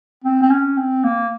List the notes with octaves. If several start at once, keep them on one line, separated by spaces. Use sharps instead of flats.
C4
C4
C#4
C4
A#3